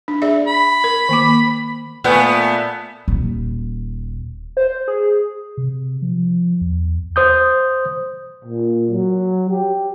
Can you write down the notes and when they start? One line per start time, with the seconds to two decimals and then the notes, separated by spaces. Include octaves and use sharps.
0.08 D4
0.22 G#4 D5 E5
0.47 B5
0.84 A#4
1.09 D#3 A#3 D6
2.04 A#2 A3 B3
3.08 D#1
4.57 C5
4.88 G#4
5.57 C3
6.02 F3
6.61 E2
7.16 C5 D#6 G6
8.45 A#2
8.91 F#3
9.50 G4